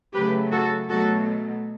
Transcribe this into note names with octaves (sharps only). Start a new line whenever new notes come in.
C#3 F#3 A3 G4 B4
F#4 A4
B2 F#3 A3 F#4 A4